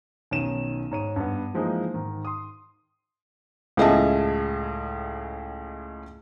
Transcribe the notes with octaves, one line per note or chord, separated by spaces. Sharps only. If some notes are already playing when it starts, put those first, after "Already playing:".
B1 D#3 C#4 D#7 E7
G#2 C#5 D#7
G2 B3
E3 F3 G#3 A#3 C4 D#4
G#2 D#3
C6 D#6
C#2 A2 G#4 D#5 E5 A5